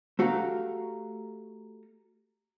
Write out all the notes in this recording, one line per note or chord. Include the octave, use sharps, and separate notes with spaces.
A3 F#4 G4 F5 A#5